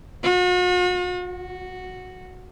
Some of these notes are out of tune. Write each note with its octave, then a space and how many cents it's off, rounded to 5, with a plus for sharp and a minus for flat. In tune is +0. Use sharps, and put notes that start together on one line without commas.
F#4 -45
F#4 -5